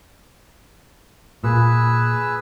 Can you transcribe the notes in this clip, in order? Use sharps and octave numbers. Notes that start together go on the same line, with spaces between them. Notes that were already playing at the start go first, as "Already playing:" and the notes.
A#2 G#4 B4 E6